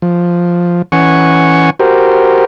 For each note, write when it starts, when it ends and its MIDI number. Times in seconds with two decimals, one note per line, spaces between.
0.02 0.82 53
0.92 1.70 52
0.92 1.70 61
0.92 1.70 78
0.92 1.70 80
0.92 1.70 85
1.79 2.45 66
1.79 2.45 67
1.79 2.45 70
1.79 2.45 72